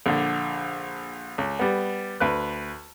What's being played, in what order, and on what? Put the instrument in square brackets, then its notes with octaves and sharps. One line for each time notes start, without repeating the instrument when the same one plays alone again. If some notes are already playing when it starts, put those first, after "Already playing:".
[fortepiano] A#1 D3
C#2
G3 B3
D2 B4 F#6